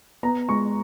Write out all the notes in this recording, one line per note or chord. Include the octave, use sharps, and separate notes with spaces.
B3 A#5
G#3 C#6